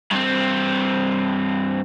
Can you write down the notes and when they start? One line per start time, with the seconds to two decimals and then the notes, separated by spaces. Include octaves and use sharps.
0.12 G2 C4